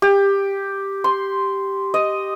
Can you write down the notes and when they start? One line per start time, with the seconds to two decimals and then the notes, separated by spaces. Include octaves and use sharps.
0.02 G4
1.04 C6
1.94 D#5